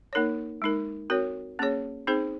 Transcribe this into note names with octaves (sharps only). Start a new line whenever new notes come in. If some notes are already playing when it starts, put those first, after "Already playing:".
A#3 D#4 A#4 C#5
G#3 D#4 A#4
C4 F#4 A#4 C#5
A#3 C#4 G#4 C#5
C4 D#4 G#4 C5